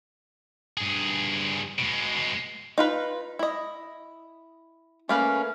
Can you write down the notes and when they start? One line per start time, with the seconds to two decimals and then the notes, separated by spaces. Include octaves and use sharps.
0.77 G2 G#4
1.78 B2 G#3
2.78 D#4 F4 B4
3.39 E4 D#5
5.09 A3 A#3 C#4 B4